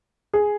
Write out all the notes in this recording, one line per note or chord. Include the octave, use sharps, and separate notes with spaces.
G#4